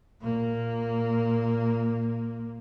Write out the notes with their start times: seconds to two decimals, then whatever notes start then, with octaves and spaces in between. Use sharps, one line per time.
0.20 A#2 A#3